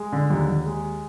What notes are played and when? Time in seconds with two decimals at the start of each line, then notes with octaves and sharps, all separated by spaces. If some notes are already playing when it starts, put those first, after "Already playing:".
Already playing: G#3
0.12 D3
0.30 D#2
0.48 D#2
0.66 G#3